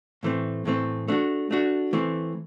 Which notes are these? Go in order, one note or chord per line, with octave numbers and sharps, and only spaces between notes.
A2 E3 A3 C4
A2 E3 A3 C4
A3 D4 F#4
A3 D4 F#4
E3 A3 C4